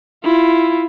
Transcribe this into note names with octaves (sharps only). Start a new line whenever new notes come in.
E4 F4